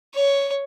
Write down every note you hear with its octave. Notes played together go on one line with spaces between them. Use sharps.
C#5